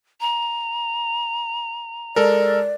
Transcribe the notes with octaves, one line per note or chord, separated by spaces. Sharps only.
A#5
G#3 A4 A#4 D5